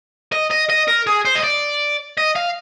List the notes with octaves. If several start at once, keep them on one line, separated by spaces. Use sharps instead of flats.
D#5
D#5
D#5
A#4
G#4
C5
D#5
D5
D#5
F5